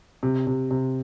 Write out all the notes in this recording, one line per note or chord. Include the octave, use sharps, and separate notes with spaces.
C3
C3
C3